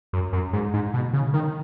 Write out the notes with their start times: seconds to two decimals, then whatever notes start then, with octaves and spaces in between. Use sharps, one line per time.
0.13 F#2
0.33 F#2
0.53 G#2
0.74 G#2
0.94 B2
1.13 C#3
1.34 D#3